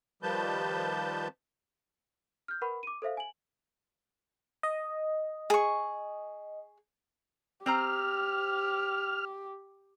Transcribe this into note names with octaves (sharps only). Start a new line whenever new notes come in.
D#3 F3 G3 B4 A5 G6
F6 G6
A#4 B4 F#5 B5 C#6
D6 D#7
A4 C5 E5 F5
G#5 F#7
D#5
G#4 C#6
C4 G4 C5 A#5 F6